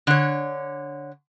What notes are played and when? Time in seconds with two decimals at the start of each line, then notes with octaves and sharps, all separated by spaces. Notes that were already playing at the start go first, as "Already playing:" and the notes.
0.07 D3 C#5